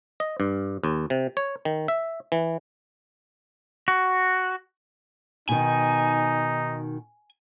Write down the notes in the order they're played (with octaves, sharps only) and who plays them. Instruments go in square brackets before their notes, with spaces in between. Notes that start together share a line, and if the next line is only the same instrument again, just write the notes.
[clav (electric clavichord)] D#5
G2
D#2
C3
C#5
D#3
E5
E3
[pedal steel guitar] F#4
[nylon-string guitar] B2 D#3 [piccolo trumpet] D#4 [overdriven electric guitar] G#5